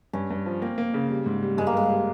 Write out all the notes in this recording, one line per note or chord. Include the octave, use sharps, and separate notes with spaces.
G2 C#4
G2
F3
A#3 C4
A#3
C#3
G3
G#2
G3
G2 G#3
A#3
G2 G#3
G3